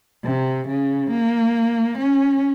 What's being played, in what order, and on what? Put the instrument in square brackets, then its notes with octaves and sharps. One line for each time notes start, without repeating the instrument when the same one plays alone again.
[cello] C3
C#3
A#3
C#4